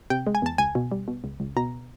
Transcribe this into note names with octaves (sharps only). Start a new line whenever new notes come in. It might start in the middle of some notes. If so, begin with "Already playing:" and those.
C3 G5
G#3
G#5
E2 A5
C#2 G#5
B2
G3
B2
C#2
C#2
B2 A#5